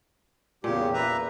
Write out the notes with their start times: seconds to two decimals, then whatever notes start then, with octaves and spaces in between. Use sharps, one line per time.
0.64 E2 A#2 C#3 G4
0.94 B4 E5 A#5